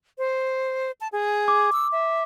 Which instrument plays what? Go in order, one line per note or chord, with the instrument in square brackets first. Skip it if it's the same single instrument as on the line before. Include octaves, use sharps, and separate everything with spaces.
[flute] C5
A5
G#4
[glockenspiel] D6
[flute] E6
E5